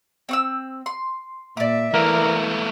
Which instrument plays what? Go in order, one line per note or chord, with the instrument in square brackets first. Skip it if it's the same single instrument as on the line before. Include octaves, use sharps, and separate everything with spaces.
[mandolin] C4 C#6 E6
C6
[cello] A#2 E5 [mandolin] D5 D6
[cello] E3 [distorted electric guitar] A3 A#3 [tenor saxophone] A#4